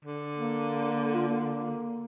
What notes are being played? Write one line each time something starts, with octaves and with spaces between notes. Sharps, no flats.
D3
A#3
F4
A#3